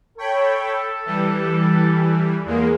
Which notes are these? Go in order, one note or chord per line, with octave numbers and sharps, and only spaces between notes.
A4 C#5 G5 B5
E3 G3
E2 G#3 A#3